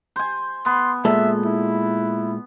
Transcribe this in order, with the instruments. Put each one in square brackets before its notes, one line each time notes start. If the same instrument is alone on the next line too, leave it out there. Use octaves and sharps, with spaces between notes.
[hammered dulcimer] C5 G#5
[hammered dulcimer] B3 [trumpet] C6
[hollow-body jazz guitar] A#2 G#3 A4 [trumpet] E5
[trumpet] E4